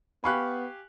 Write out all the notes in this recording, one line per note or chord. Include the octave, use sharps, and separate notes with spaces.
B3 G4 F5 G#5 B5 C#6 F#6